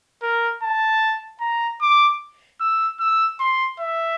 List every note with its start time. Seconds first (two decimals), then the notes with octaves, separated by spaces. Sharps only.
0.22 A#4
0.63 A5
1.41 A#5
1.81 D6
2.61 E6
3.00 E6
3.40 C6
3.80 E5